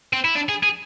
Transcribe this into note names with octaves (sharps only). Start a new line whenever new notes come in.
C4
E4
D4
G#4
G#4